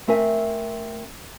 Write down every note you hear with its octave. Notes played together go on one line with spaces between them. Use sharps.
A3 C4 A#4 E5 G#5